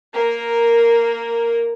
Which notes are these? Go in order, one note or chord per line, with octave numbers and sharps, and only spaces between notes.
A#3 A#4